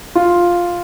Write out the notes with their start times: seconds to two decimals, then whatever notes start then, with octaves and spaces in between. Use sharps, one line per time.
0.15 F4